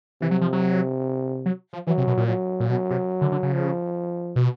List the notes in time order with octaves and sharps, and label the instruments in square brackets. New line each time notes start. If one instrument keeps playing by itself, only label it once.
[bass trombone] C3 [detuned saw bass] E3
[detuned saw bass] F#3
F3
F#3
F#3
F3
[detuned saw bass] E3 [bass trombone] F#3
[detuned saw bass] C3
B2
A#2
[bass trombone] F#3
[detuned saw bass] A#2
[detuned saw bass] B2 [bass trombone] F#3
[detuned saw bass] C3
D3
D3
C#3
[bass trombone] F3
[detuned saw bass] B2